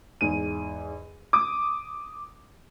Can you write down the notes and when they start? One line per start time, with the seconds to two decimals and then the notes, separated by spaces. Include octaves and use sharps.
0.21 E2 G#2 D#7
1.33 D6 D#6